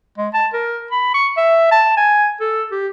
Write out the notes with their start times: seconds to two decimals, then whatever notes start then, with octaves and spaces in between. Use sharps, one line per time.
0.18 G#3
0.34 A5
0.53 A#4
0.91 B5
1.14 C#6
1.37 E5
1.71 A5
1.97 G#5
2.41 A4
2.72 G4